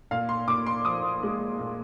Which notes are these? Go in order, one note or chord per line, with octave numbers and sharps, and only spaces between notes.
A#2 F5
C6
A#2 D6
C6
F3 D#6
G#3
A#2